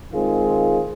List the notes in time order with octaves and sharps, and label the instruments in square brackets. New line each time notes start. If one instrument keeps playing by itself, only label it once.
[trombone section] D#3 G#3 C4 F4 G#4